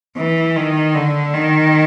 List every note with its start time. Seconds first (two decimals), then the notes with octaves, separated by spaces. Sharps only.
0.17 E3
0.56 D#3
0.95 D3
1.34 D#3